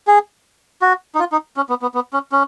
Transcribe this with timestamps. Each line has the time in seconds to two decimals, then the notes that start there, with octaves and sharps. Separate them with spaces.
0.07 G#4
0.82 F#4
1.15 D#4
1.19 F4
1.32 D#4
1.57 C#4
1.69 B3
1.82 B3
1.94 B3
2.13 C#4
2.32 C#4